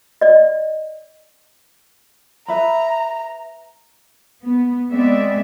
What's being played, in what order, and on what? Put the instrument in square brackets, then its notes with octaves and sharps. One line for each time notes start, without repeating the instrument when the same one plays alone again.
[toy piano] D5 D#5
[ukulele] B4 E5 B5 [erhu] A#5
[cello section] B3
G#3 B3 C4 D5 E5